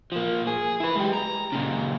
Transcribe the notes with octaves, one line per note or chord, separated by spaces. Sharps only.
F3 A#3
G#4
E4 B4
G#3 G4
A#5
A#2 C#3